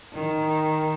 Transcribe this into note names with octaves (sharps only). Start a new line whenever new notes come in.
D#3